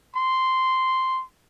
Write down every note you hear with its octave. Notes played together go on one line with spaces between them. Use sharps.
C6